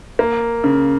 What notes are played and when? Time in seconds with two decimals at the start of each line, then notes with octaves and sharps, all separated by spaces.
0.19 A#3
0.64 C#3